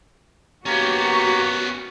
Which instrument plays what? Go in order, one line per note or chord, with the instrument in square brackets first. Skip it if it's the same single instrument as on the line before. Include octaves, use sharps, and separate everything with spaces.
[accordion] A#3 G4 A#5 [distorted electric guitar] B3 C#4 [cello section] F#4